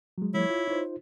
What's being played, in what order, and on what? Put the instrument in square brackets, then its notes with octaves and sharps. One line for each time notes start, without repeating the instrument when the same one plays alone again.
[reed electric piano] F#3 G#3
[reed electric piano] F3 G3 A3 [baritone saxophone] E4 [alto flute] C#5
[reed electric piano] F4
D#4 F4 C5